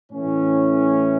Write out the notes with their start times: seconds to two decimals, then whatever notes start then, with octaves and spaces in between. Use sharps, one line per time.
0.12 A2 E3 C#4